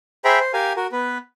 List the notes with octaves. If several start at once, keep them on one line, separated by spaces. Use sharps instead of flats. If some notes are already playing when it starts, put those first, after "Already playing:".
G#4 C5 E5 G5 A#5 B5
C5
G4 A#4 F5 G#5
F#4 A#4
B3 B4